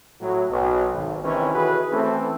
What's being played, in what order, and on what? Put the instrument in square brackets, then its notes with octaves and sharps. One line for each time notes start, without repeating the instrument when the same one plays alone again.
[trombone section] A2 F#3
B1
G#1
C3 D#3 E3 C#4
E4 F#4 G#4 A4 B4
E3 A3 C4 C#4 A4